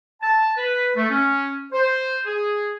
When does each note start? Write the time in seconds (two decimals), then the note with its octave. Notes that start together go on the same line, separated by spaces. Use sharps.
0.22 A5
0.58 B4
0.96 A3
1.10 C#4
1.73 C5
2.26 G#4